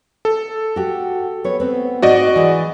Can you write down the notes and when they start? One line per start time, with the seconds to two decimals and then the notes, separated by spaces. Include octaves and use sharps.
0.25 A4
0.76 F#4 G4
1.44 B3 C#5
1.60 B3 C4
2.02 G#2 C4 F#4 D5 D#5
2.36 E3 G#3